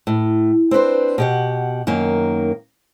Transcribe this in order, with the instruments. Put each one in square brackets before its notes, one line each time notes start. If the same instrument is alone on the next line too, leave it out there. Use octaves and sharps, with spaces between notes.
[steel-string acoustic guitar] A2
C4 D4 B4 C5
B2 G4 F#5
F#2 D#3 A#3